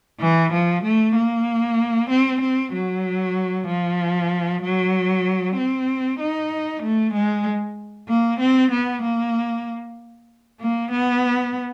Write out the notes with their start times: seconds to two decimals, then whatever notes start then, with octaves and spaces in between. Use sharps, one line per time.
0.20 E3
0.53 F3
0.83 A3
1.15 A#3
2.10 C4
2.41 C4
2.73 F#3
3.67 F3
4.62 F#3
5.57 C4
6.20 D#4
6.83 A3
7.14 G#3
8.08 A#3
8.40 C4
8.71 B3
9.02 A#3
10.60 A#3
10.92 B3